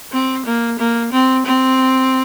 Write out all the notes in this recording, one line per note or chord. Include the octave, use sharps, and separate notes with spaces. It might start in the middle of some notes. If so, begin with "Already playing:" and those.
C4
A#3
A#3
C4
C4